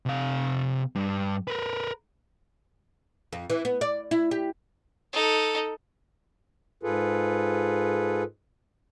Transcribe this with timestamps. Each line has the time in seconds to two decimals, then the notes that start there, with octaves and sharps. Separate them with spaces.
0.05 C3 F5
0.95 G2
1.48 A#4 B4
3.33 F2
3.50 E3
3.65 B3
3.81 D5
4.11 E4
4.31 G4
5.13 D#4 A4
6.83 G#2 F4 G#4 A4 B4